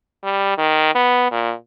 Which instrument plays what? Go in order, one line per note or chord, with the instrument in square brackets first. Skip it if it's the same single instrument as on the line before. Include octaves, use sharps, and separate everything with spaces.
[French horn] G3
D#3
B3
A#2